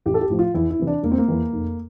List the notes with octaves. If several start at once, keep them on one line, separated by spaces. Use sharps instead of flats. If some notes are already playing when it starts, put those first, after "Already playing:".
A1 G4
A4
G4
A2 F3
F4
E2 E4
E4
C3 E3
D4
E1 A#3
C4
A#3
E2 E3
F1